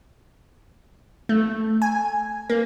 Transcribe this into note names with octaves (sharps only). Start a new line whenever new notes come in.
A3
G#5
A#3